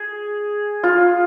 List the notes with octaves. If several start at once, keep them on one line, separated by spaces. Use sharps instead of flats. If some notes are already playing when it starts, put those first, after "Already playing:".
Already playing: G#4
F4